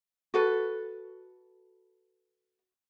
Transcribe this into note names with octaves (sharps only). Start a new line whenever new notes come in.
F#4 A4 B4